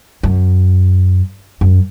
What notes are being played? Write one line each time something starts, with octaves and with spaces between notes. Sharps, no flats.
F#2
F#2